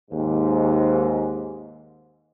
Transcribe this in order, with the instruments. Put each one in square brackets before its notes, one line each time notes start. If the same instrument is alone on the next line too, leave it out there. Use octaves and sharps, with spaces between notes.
[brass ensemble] D#2 G#2